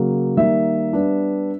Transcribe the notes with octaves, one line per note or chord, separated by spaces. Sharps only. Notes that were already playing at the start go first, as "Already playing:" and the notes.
Already playing: C#3 F#3 A#3
D#3 G3 A#3 E5
G3 B3 D4